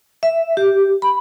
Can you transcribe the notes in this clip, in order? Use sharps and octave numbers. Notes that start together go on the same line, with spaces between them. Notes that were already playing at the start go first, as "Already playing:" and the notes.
E5
G4
B5